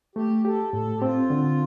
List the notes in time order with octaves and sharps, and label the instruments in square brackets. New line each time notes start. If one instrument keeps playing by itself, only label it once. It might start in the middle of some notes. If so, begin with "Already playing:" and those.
[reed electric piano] A3 [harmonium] G4
[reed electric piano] G4 [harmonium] A4
[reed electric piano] A2 [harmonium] A4
[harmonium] G4
[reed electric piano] C4 [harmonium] F4
[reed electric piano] D3